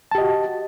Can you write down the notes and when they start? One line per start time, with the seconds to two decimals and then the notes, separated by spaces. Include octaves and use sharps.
0.11 A5
0.15 G4
0.18 D#5
0.21 F#4